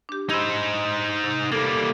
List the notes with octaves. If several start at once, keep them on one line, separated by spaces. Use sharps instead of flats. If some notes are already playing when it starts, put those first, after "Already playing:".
D4 G4
D#4 C5 B5 E6 G#6
C3
G3 A#3 A4